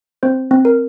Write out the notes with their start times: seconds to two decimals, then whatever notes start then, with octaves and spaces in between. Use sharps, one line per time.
0.23 C4 C5
0.51 C4
0.65 A#4